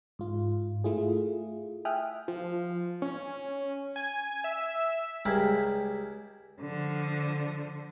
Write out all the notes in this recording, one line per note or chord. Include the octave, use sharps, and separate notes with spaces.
G#2 F4
A3 E4 F4 G#4
E5 G5 G#5 D#6 F6 F#6
F3
C#4
G#5
E5
C#2 G3 E4 G#4 A#4 B5
D3 F3